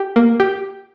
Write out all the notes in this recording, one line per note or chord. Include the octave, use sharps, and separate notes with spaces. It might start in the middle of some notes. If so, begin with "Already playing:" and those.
Already playing: G4
A#3
G4